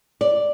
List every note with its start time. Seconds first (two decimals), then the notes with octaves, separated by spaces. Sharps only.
0.21 D5